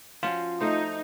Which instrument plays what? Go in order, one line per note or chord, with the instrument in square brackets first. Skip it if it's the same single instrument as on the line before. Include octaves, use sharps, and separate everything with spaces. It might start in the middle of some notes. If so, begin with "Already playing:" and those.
[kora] F3 C#4 F#4 [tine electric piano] F4
[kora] A3 C5 [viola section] D#4